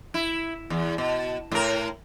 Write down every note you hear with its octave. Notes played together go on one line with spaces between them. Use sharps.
E4
E2
B2
A2 A#4